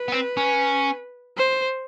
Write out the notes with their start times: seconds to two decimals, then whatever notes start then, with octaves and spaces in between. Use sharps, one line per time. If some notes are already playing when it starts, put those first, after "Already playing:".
Already playing: B4
0.08 B3
0.12 C4
0.37 C#4
1.38 C5